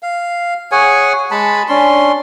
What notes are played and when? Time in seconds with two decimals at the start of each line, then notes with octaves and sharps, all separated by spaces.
0.03 F5
0.72 G#4 C#5 F#5 G#5
1.31 G#3 A5 B5
1.69 C#4 D4 C6